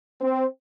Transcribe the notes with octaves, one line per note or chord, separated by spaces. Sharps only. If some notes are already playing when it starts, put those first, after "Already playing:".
C4